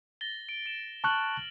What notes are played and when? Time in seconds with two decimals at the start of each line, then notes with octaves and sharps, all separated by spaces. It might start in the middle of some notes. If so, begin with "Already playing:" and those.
0.21 A6 A#6 G7
0.49 D7
0.66 D7 E7
1.04 A5 C#6 F6 F#6 F#7